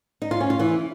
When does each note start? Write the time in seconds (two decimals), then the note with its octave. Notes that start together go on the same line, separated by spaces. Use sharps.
0.22 D#4
0.31 F4
0.41 C#4
0.50 F4
0.59 E3